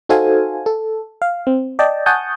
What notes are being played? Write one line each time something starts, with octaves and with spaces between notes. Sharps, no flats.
D#4 F#4 A4 C5 F5 G#5
A4
F5
C4
D5 D#5 G5 A5
F#5 G#5 A5 C#6 D#6 G6